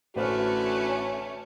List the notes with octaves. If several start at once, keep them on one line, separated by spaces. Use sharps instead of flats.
A1 D3 A3 C#4 F#4 B4 C5 F6